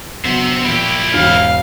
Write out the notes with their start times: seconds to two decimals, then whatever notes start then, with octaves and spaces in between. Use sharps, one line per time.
0.25 D3 F#3 B3 C5 E5
0.65 A#2 F3 A#3 E4 G4
1.14 E1 G#2 F5